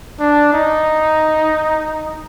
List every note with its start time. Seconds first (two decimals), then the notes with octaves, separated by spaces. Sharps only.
0.20 D4
0.53 D#4